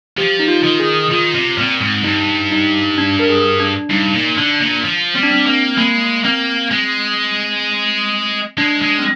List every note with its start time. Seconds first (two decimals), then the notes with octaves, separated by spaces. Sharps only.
0.17 F3 G4
0.39 D#4
0.48 F4
0.63 D#3
0.80 G#4
1.11 D#3 F4
1.34 C3
1.57 A#2 C4
1.81 G#2
2.04 G2 D#4
2.51 D#4
2.98 D4
3.19 A#4
3.29 G#4
3.60 D4
3.90 G2 D#4
4.14 A#2
4.37 D3 D4
4.61 A#2
4.84 F3
5.15 G3 C4
5.23 D4
5.31 C4
5.46 A#3 C4
5.77 G#3 A#3
6.24 A#3 C4
6.71 G#3
8.58 G#3 D4
8.82 G#3
8.99 C4